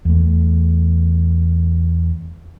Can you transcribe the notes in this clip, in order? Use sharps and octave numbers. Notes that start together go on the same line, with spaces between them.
E2 A3